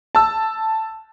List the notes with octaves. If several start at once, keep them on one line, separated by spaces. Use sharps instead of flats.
A5 E6